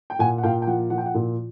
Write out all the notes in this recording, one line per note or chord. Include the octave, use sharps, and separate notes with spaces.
G5
A#2 F#5 G#5
F#5
A#2 F5 G5
G5
F3 F#5
F3 F#5
G5
F#5
A#2